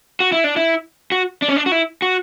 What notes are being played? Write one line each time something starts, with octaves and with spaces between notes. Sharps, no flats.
F#4
E4
D4
E4
F#4
D4
C#4
D4
F#4
E4
F#4